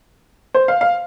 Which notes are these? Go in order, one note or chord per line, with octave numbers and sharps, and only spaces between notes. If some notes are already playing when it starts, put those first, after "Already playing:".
C5
F5
F5